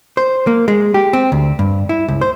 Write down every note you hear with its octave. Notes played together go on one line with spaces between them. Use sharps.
C5
A#3
G#3
G4
C4
D2
G2
E4
C#2
C5